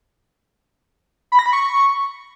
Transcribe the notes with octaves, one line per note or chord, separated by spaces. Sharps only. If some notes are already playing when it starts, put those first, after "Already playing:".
B5
A#6
B5
C#6